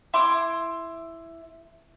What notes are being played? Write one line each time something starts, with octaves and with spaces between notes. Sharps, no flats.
E4 C6 D6